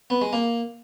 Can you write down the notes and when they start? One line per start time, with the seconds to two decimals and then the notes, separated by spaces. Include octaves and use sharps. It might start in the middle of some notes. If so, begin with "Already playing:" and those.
0.10 B3
0.21 G#3
0.33 A#3